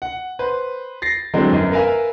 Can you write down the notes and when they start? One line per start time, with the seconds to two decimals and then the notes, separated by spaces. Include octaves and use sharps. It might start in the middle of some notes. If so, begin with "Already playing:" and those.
0.02 F#5
0.39 B4 C5
1.02 A6 A#6 C7
1.33 D3 E3 F#3 G#3 C4
1.52 G1 F#2
1.72 A#4 B4 E5 F5 G#5 A#5